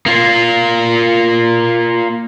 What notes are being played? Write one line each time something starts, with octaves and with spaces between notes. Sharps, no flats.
A#3 F4